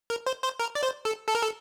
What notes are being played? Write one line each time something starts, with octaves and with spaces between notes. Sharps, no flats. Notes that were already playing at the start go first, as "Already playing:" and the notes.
A#4
C5
C5
A#4
D5
C5
A4
A4
A#4
A4